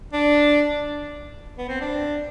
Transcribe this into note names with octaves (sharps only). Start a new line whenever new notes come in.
D4
B3
C4
D4